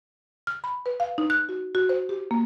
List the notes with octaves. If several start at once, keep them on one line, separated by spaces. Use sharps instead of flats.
F6
B5
B4
F5
D#4
F#6
F#4
F#4
C5
G4
A#3